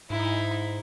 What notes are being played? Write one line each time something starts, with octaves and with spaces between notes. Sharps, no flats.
G#2 D#4 E4